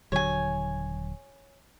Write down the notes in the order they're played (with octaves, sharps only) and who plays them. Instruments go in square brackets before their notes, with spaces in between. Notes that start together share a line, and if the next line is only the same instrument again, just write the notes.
[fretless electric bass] D#1 D3 F#3 [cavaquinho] C#5 G#5